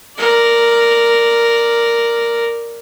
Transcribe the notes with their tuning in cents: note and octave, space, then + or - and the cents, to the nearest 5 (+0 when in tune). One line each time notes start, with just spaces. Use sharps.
A#4 +0 D5 +0